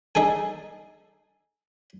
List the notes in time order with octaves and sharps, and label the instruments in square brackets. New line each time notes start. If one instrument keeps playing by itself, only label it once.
[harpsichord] D#4 G#4 A4 G#5